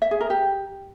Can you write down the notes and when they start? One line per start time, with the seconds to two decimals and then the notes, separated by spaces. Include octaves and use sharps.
0.02 E5
0.11 G#4
0.21 A#4
0.30 G4